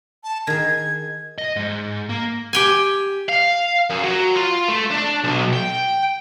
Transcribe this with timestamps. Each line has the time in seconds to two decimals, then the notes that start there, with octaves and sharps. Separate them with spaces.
0.24 A5
0.47 D#3 G#4 G#6
1.38 D#5
1.56 G#2
2.09 A#3
2.53 G4 G5 G#5
3.29 F5
3.90 F#2
4.04 F#3
4.36 F4
4.69 A3
4.91 D4
5.24 B1
5.53 G5